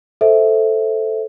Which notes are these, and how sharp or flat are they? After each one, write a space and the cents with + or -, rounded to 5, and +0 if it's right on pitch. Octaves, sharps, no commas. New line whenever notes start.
A4 +0 C5 +0 E5 -10